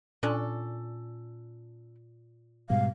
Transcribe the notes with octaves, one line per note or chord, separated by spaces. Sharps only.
A#2 C#4 D4 A4
G#2 B2 G3 F5